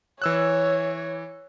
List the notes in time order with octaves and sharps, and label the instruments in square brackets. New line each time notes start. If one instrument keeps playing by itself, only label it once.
[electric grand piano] E3 E6 F#6 [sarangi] C#5